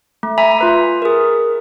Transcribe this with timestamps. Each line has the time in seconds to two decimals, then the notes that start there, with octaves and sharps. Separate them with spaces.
0.23 A3
0.38 E5 G#5 A#5 B5
0.59 F4 B4 E5
1.02 G#4 A#4